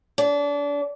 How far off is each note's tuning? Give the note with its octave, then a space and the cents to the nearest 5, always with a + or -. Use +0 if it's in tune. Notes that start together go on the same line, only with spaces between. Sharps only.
D4 -30